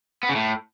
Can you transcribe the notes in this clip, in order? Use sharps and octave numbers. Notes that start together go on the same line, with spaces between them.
B3
C#3
A2